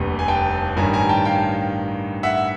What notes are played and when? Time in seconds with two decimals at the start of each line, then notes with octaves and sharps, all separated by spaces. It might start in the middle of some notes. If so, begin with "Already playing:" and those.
Already playing: F1 D#2 D3 G3 B3
0.19 G#5
0.28 G5 A5
0.76 A1 G2 D#3 G#5 A#5
0.93 G#5 A#5
1.09 G5 A5
1.25 F5 G5
2.23 E5 F#5